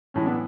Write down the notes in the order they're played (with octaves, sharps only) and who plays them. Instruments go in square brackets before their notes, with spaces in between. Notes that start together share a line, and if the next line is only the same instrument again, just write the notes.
[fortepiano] A2 E3 G#3 C#4
B3 D4